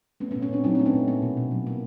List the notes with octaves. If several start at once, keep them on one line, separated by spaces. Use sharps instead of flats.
A3 B3 C#4
B3 C#4
A#2
B3 C#4
A#2 C4 D4
F#3 C#4 D#4
C4 D4
A3
B3 C#4
A#2
A#3 B3
B2
B2
F#3
A#3